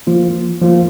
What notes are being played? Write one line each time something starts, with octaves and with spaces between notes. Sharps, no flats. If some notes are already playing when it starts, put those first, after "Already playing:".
F3 A#3 F4
F3 A#3 F4